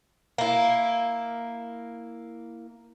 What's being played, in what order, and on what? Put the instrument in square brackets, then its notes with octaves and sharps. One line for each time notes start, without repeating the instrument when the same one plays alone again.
[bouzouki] A#3 E4